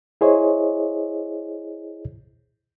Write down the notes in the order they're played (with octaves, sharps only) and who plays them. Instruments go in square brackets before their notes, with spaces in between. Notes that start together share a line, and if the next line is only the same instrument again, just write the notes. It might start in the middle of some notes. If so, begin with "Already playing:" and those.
[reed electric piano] E4 G#4 C5 C#5 D#5